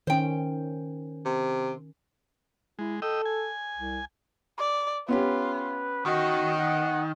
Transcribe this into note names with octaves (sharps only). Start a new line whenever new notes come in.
D#3 C#4 C5 G5
C3
G#3 E4
A4 D#5 G5 E6
G#5
C2
D5
B3 C#4 F4 G4 B4
D#3 F#4 D#5
F#5